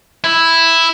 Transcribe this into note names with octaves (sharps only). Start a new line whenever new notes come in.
E4